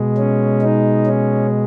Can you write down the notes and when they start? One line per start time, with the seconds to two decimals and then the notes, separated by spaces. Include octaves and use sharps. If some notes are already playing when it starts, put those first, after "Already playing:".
Already playing: B2 G#3
0.18 C#4
0.62 D#4
1.07 C#4